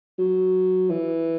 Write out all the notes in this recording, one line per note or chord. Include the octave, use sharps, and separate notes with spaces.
F#3
E3